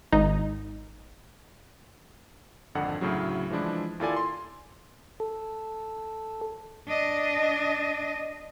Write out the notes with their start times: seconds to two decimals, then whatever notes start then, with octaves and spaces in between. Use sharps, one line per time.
0.12 G#1 D#4
2.75 G#1 F2 D3 F#5
3.01 D2 A2 C#3 F#3
3.50 E3 F3 G#3 D4 E4
4.00 D#2 E4 F4 A4 D5 G#5
4.16 C6
5.20 A4
6.88 D4 D#5